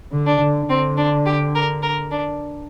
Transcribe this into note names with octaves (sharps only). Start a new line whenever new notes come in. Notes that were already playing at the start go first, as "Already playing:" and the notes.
D3
D4
D3
D3 C4
D4
G4
A#4
A#4
D4